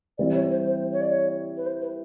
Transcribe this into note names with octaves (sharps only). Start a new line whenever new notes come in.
E3 G3 C4 E4 D5
C#5
C5
C5
C#5
D5
C#5
B4
C5
B4